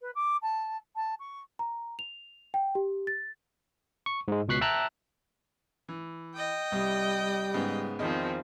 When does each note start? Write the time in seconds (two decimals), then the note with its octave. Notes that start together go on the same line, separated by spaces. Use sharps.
0.01 B4
0.15 D6
0.42 A5
0.96 A5
1.19 C#6
1.59 A#5
1.99 F7
2.54 G5
2.75 G4
3.07 A6
4.06 C#6
4.28 G#2 G#3
4.48 C#2 B2 C#6 F#6 B6 C7
4.61 E5 G5 A5 A#5 E6 F#6
5.88 E3
6.35 D#5 G5
6.72 C2 G3 D#6
7.54 G#2 C#3 B3
7.99 E2 D#3 F3 C4 D#5